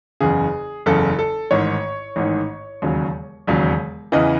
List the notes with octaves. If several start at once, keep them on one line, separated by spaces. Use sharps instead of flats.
F#1 E2 C#3 G#4
F#1 E2 C#3 A4
A4
A1 G#2 D#3 C#5
A1 G#2 D#3
E1 D#2 C#3 F#3
E1 D#2 C#3 F#3
E2 C#3 E3 D#5